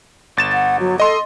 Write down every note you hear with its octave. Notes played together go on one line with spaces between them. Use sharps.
G1 A6 E7
F#5
F#3
A4 D#5 C6